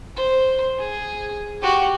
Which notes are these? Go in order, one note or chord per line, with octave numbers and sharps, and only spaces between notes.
C5
G#4
F#4 G4